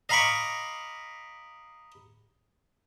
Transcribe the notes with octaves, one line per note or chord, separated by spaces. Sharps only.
D#5 F5 A#5 B5 C#6 D6